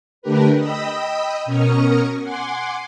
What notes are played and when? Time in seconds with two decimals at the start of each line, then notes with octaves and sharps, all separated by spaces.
0.22 D3 A3 D4 G4 A#4 B4
0.58 D#5 G5 B5 D#6 E6
1.45 B2 C#4 A#4 C#6 D#6 F6
2.20 F#5 G#5 C6 D6